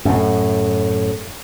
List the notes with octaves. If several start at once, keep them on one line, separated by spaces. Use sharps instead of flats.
F#2 A2